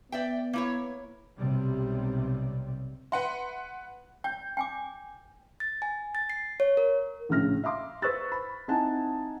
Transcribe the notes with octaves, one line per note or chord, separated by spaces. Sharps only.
B3 D5 E5 G5
A#3 E4 C#5
B1 C3 G3
B4 E5 F#5 C6
G5 G6
G5 G#5 D6
A6
G#5
A6
C7
C#5
A#4
A#1 A2 C#3 F6 A#6
E5 F5 C6 D6
B4 C5 C#6 E6 F#6 A6
B5
C4 D#4 E4 F#5 G#5 A5